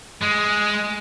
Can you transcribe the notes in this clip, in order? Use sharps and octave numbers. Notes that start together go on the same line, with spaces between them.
G#3